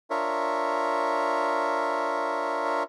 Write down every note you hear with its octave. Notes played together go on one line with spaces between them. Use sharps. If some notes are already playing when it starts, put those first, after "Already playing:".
D4 F4 A#4 C#5 E5